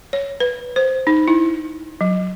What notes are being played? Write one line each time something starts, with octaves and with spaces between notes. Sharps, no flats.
C#5
B4
C5
D#4
E4
F#3